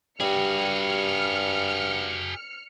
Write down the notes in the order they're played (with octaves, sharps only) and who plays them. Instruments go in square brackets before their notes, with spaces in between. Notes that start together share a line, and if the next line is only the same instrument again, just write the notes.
[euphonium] G2 [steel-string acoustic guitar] G3 [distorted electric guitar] F#4 G#4 [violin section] F6 C#7